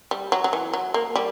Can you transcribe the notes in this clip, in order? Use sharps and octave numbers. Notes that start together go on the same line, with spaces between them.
G3
F#3
F#3
E3
F#3
A#3
G3